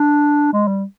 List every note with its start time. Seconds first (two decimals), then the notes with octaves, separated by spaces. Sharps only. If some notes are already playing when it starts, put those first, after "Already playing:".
Already playing: D4
0.53 G#3
0.68 G3